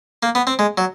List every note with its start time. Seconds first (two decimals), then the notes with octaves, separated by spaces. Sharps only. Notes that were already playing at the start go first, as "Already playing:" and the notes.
0.23 A#3
0.35 B3
0.47 C4
0.59 G#3
0.78 F#3